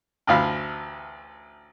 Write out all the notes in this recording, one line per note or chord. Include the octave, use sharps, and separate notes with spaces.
A1 D2 F5 B5